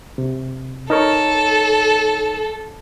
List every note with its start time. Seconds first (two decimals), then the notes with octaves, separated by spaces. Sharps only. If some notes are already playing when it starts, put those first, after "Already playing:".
0.18 C3
0.90 D#4 A4 A#4 C#5